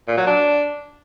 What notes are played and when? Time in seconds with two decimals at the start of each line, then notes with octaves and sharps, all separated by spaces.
0.07 A#2
0.17 F#3
0.27 D4